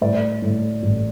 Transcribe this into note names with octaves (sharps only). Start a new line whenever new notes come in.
A2 D5
A2
A1